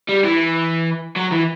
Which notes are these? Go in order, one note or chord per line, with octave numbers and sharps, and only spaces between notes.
G3
E3
F#3
E3